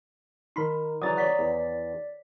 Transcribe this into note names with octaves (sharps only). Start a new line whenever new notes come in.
D#3 D#4 A#4 B5 C6
C#3 E3 F#3 D5 A#5 D#6 A6
C#5 D5 F#5 B6
E2